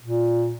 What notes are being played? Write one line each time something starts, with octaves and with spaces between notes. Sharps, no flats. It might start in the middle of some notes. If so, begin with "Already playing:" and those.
A#2